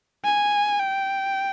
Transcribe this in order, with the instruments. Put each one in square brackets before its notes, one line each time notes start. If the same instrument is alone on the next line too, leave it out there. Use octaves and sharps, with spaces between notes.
[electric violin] G#5
G5